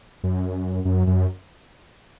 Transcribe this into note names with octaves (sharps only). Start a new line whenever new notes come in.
F#2
F#2
F#2